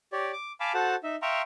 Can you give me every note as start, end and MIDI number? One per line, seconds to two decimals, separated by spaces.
0.13 0.32 67
0.13 0.32 73
0.13 0.32 74
0.33 0.52 86
0.60 0.73 77
0.60 0.73 80
0.60 0.73 81
0.60 0.73 83
0.60 0.73 86
0.74 0.95 66
0.74 0.95 69
0.74 0.95 72
0.74 0.95 78
0.74 0.95 81
1.03 1.16 63
1.03 1.16 76
1.22 1.42 76
1.22 1.42 77
1.22 1.42 79
1.22 1.42 82
1.22 1.42 84
1.22 1.42 85